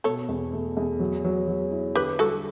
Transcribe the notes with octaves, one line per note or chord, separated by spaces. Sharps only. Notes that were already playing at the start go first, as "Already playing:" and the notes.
B2 A4 C#5
E2
A3
E2
F#3
F#3
F#3
E4
D3 G4 B4
G3 F#4 A4